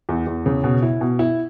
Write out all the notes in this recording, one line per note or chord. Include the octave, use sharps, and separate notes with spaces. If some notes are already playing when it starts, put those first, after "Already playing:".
E2
E2
C#3
B2
E4
B2
E4